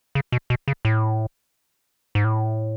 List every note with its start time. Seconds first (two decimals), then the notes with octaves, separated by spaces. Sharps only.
0.15 C#3
0.32 B2
0.50 B2
0.68 C#3
0.85 A2
2.15 G#2
2.25 A2